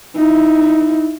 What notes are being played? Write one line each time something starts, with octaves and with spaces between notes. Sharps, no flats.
D#4 E4